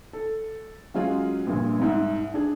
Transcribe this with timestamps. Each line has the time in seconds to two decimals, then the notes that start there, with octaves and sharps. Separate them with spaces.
0.13 A4
0.94 F#3 G#3 C#4 F4 F#4 G#4
1.47 A#1 G2 A#2
1.79 C2 G#2 E5
2.34 D4 G#4